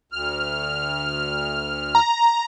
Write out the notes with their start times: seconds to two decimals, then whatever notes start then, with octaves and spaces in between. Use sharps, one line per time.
0.12 D2 F6
1.95 A#5